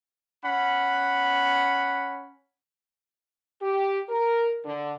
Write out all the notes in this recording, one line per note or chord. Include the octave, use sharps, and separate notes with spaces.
C#4 F#5 B5
G4
A#4
D3